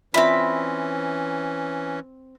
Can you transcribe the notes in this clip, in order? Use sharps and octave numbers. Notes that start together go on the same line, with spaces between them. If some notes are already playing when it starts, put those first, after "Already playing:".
E3 C4 C#4 F4 D5 E5 B5